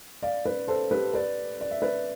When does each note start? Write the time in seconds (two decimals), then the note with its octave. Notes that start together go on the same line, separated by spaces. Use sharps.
0.22 D5 F5
0.45 B4 D5
0.67 A4 C5
0.91 G4 B4
1.14 B4 D5
1.61 D5
1.71 E5
1.82 B4 D5